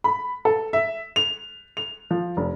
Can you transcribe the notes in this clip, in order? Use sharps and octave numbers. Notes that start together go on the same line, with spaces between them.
B5
A4
E5
F7
F7
F3
F1